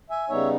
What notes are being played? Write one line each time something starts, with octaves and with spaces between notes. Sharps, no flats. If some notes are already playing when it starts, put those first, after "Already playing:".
E5 G#5
C#3 G3 B3 D#4 C#5 E5